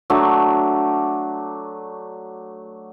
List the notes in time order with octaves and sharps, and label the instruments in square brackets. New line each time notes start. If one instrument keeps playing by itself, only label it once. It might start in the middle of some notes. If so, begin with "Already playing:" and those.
[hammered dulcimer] F#3 A3 D4